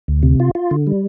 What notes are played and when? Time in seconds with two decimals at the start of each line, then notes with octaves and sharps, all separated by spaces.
0.08 D2
0.23 C3
0.40 F4
0.55 F4
0.71 D3
0.87 G3